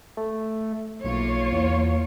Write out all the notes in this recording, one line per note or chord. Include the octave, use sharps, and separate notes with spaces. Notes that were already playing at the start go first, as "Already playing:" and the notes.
A3
B1 A#3 F4 C#5
E2